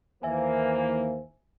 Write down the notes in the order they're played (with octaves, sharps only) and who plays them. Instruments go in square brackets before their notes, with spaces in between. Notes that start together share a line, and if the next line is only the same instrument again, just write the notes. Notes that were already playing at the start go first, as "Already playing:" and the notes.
[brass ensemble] D#2 C5 [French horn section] E3 A#3 [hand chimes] E5 G#5